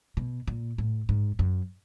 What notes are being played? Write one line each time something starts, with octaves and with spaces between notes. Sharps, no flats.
B2
A#2
A2
G#2
F#2